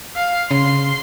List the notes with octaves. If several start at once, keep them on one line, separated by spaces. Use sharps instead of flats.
F5
C#3 C6